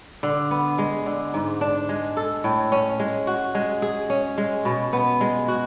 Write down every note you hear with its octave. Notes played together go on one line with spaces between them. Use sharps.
D3
B3
G#3
D3
G#2
D4
G#3
A4
A2
C#4
G#3
F#4
G#3
G#4
C#4
G#3
B2
B3
G#3
F#4